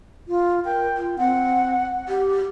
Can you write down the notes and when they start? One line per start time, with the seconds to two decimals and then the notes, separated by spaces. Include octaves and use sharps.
0.28 F4
0.65 A#4 G5
0.97 F4
1.19 C4 F#5
2.09 G4